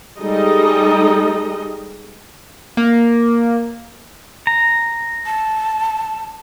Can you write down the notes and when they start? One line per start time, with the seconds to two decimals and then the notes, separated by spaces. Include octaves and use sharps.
0.19 G3 G#3 D#4 A4 D#5
2.77 A#3
4.47 A#5
5.26 A5